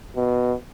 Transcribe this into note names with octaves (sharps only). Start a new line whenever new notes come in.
B2